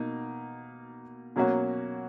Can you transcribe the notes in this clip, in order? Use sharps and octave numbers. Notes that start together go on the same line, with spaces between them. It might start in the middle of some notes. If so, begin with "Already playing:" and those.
Already playing: B2 A#3 D#4
B2 F#3 A#3 C#4 F#4